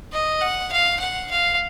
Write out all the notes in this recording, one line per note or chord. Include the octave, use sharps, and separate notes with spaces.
D#5
F#5
F5
F#5
F5